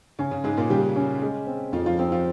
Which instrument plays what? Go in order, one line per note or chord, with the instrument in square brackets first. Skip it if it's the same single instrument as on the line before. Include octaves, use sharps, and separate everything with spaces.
[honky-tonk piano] C#3 [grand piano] C#4
[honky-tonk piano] C#3
[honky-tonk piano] G#2 G#3 [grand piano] G#4
[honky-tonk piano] A#2 A#3
[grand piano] C#3 [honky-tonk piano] G3 G4
[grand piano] C#4
G#3
C4
[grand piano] F2 [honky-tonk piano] F3 F4
[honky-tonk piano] F3 F4
[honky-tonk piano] F3 F4 [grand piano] C4
[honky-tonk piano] F3 F4